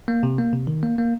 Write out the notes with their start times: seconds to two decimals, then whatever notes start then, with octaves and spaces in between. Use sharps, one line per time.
0.08 A#3
0.23 C3
0.38 A#3
0.53 C3
0.67 D#3
0.83 A#3
0.98 A#3